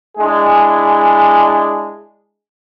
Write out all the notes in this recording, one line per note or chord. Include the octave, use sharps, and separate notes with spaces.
G#3 D4 E4 G#4